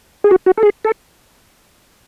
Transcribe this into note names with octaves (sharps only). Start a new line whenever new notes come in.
G#4
F#4
F#4
A4
G#4
A4